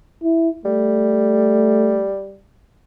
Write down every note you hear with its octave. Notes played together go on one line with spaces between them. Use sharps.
E4
G3 A3